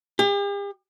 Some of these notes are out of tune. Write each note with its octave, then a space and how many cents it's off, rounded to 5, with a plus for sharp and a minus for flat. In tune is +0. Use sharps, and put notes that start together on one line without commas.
G4 +45